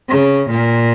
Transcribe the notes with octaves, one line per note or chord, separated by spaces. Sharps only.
C#3
A#2